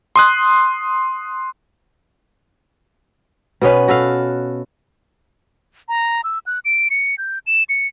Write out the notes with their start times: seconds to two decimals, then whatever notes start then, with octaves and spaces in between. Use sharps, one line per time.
0.16 C6 D#6 F#6
3.61 B2 B3 C#4 B4
3.88 F#4 A4 B4 F5
5.89 A#5
6.24 E6
6.46 F#6
6.65 D7
6.90 C#7
7.18 G6
7.47 E7
7.69 C#7